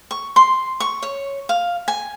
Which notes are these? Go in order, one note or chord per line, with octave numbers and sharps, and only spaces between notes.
C#6
C6
C#6
C#5
F5
G#5